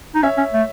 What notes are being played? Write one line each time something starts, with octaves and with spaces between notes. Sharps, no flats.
D#4
C#4 C#5 E5
C#4
A3